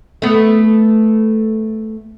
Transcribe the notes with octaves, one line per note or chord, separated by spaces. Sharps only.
A3 B3